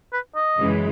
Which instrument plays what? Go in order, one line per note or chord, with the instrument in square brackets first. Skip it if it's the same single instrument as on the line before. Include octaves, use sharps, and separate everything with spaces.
[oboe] B4
D#5
[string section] F#2 C#3 E3 G#3